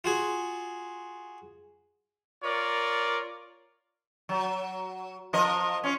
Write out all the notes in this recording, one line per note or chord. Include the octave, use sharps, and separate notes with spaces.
F4 F#4 G#4
F4 A#4 C#5 D5
F#3
F3 A#4 D#5
C#4 F4